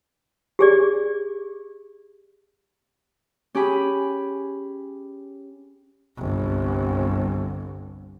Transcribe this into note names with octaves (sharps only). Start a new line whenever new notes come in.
G4 G#4 D5
C#4 G4 G#4 B5
G1 C2